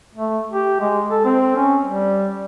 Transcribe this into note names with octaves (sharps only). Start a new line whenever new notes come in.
A3
G4
G#3
A4
C4
C#4
G3